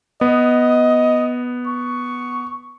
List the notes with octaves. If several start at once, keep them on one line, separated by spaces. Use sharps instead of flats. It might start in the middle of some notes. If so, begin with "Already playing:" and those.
B3 D#5
C#6